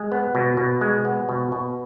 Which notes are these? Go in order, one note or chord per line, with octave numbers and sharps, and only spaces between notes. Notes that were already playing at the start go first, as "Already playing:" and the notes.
Already playing: G#3
B3
B2
B2
G#3
B3
B2
B2